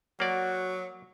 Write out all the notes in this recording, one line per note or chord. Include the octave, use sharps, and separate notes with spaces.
F#3 A#3 F#4 D5